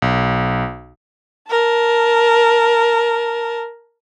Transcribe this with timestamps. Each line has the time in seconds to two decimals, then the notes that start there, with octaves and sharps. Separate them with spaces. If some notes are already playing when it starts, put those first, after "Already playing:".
0.02 B1
1.50 A#4 A5